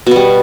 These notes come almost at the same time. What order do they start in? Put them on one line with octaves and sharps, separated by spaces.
B2 B3 G3